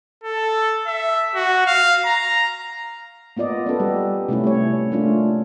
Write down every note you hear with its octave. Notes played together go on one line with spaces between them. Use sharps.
A4
E5
F#4
F5
A#5
A#3 B3 F4 D5 D#5
B3 C#4 A4 B4
G3 G4
C3 A3 C#4 E4
C#4 C#5
A3 A#3 C#4 D4 F4